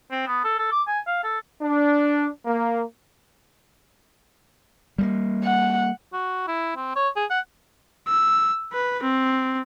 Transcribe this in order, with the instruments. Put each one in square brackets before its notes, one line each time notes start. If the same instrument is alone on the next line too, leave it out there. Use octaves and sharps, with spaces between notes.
[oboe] C4
B3
A4
A4
D6
G#5
F5
A4
[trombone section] D4
A#3
[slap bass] G3 G#3 A#3
[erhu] F#5
[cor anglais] F#4
E4
C4
C#5
G#4
F#5
[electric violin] E6
B4
C4